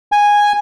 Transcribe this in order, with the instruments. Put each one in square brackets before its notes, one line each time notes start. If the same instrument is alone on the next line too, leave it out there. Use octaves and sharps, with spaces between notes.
[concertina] G#5